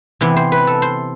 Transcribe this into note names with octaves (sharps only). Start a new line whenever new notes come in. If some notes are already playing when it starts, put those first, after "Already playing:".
C3 E3 B3
C5
B4
A4
C5